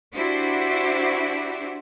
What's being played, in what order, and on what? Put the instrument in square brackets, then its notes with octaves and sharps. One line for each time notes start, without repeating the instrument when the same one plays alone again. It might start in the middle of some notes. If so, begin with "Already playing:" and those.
[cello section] D4 E4 F#4 G4 C5